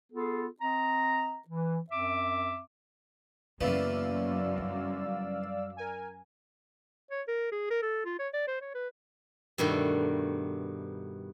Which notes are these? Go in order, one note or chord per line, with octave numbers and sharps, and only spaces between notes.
B3 F4 G#4 A4
C4 D#5 A#5
E3
F#2 C4 E5 D6
F#2 C#3 E3 A#3 B3 D5 F5 E6
G3 D4
A#4 G#5
C#5
A#4
G#4
A#4
A4
F4
C#5
D5
C5
C#5
B4
G2 B2 D#3 A3